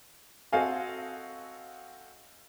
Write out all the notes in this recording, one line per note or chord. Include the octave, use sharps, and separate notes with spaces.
C4 F#4 A4 D#5 F5 G#5